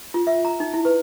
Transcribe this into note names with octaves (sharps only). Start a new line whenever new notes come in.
F4
E5
A#5
D#4
E4
B4